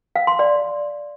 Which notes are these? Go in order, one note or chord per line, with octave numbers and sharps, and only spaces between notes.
F5
C6
D5